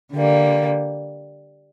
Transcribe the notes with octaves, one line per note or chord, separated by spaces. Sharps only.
D3 G3 A#3